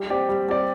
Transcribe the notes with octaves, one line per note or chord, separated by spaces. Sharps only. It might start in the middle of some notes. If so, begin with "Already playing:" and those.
Already playing: G3
C4 G4 D5
G3
C4 G4 D5